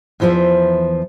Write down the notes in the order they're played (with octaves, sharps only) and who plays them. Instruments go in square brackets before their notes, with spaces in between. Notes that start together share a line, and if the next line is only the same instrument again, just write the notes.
[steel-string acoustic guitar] E2 E3 F3 C5 E5